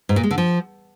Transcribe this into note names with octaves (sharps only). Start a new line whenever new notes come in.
G#2
A#2
G#3
D3
F3